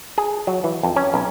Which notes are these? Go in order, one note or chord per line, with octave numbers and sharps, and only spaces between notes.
G#4
F#3
E3
F2
C#4
B1